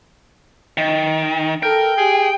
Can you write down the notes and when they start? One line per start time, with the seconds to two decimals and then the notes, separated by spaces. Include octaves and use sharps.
0.77 D#3
1.63 A4 A#4 G5
1.97 G4 G#4